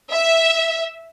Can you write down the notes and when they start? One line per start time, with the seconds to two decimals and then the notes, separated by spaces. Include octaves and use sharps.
0.11 E5